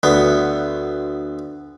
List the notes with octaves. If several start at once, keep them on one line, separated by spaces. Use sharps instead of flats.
D2 B3